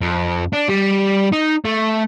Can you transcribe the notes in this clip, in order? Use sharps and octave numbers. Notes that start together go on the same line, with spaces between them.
F2
D4
G3
D#4
A3